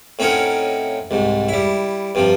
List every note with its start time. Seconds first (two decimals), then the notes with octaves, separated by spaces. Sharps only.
0.19 A2 C4 C#4 D#4 A#4 F#5
1.11 C2 G#2
1.49 G3 E4
2.15 G2 C3 F3